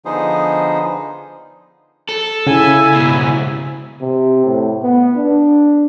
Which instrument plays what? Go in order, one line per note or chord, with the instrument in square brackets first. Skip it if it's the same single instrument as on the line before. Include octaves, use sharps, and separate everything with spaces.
[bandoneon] D3 F3 B3 D#4 G#4 C5
[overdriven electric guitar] A4
[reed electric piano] C#3 [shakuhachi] E4 [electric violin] G#5 E6
[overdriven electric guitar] G#2 B2
[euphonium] C3
A2
B3
D4